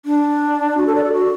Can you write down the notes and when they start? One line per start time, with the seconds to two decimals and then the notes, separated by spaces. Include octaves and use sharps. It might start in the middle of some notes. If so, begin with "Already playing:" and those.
0.06 D4
0.77 F#4
0.86 A4
0.95 D5
1.04 A4
1.13 F#4